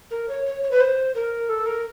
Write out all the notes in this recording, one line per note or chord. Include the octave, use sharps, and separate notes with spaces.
A#4
C#5
C#5
C#5
B4
C5
A#4
A4
A#4